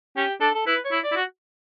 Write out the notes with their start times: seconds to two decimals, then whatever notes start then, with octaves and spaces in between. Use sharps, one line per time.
0.17 C#4 G4
0.41 D4 A4
0.55 A4
0.66 E4 B4
0.85 C#5
0.92 E4
1.04 D5
1.12 E4
1.16 F#4